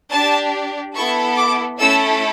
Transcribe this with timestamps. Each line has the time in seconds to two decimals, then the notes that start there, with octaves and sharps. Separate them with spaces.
0.11 D4 G4 A5
0.95 B3 E4 A4 C#6
1.36 D6
1.78 A3 C#4 E4 A4 E6